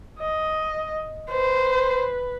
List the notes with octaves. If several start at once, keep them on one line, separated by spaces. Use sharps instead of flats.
D#5
B4 C5